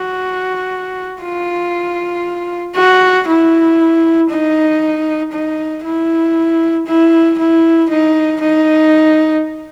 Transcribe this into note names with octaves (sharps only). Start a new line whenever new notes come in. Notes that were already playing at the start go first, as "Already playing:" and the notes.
Already playing: F#4
F4
F#4
E4
D#4
D#4
E4
E4
E4
D#4
D#4